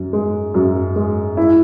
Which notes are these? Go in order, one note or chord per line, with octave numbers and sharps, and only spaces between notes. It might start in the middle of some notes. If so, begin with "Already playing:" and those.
Already playing: F#2
G#3
F#2
G#3
E4